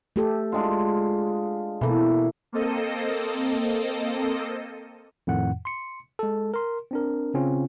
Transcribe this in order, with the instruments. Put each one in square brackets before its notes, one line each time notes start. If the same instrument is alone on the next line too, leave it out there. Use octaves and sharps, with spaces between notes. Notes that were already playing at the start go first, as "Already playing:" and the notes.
[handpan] A3 G4 A4
[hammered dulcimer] G#3 D4 F4
[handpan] B2 A4 [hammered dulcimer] E3 A#3
[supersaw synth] A#3 C4 A4 D#5
[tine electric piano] F2 A2 D#3 F#5
C6 C#7
G#3 A4
A#4 C6
C4 D4 A#4
C#3 C4 C#4 F4